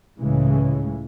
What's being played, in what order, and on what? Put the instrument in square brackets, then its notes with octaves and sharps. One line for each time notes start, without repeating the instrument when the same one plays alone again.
[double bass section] C#2 A2 C#3 E3 G#3